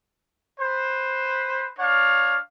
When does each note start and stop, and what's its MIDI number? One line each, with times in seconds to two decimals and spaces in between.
0.60 1.68 71
0.60 1.68 72
1.79 2.38 62
1.79 2.38 73
1.79 2.38 77